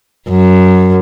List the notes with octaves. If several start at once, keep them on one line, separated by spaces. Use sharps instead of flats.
F#2